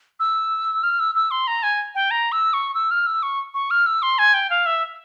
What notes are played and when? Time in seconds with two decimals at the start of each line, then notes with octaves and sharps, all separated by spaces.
0.20 E6
0.83 F6
1.00 E6
1.15 E6
1.31 C6
1.47 A#5
1.63 G#5
1.95 G5
2.11 A#5
2.32 E6
2.53 C#6
2.74 E6
2.91 F6
3.06 E6
3.23 C#6
3.54 C#6
3.71 F6
3.86 E6
4.02 C6
4.19 G#5
4.34 G5
4.50 F5
4.66 E5